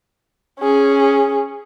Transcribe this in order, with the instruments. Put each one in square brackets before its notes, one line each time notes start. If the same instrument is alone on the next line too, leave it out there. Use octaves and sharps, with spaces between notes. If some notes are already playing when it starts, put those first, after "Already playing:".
[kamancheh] C#4 G#4